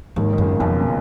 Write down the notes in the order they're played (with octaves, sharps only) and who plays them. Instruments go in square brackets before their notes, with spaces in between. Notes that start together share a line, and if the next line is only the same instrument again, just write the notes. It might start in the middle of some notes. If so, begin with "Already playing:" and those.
[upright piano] D#2 D#3 [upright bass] G#2
[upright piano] D#3
[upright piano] C#2 C#3 [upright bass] F#2
[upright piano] B1 B2 [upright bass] F2
[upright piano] A#2